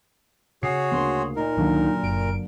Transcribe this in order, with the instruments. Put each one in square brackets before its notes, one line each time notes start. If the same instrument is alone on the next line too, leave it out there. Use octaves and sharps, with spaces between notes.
[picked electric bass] C#3 [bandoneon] F#4 G#4 C#5 [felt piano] C7
[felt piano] D2 A#3 [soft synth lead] C6
[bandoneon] A#2 A#4 [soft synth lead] D#4
[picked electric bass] C#2 D#3 D4 [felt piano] D3 F#3 A#3
[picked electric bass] F#1 [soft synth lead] D7